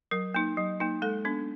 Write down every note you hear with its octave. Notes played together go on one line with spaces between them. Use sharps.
F#3 A#4
A#3 D#4
F#3
A#3 D#4
G#3 A4
B3 D4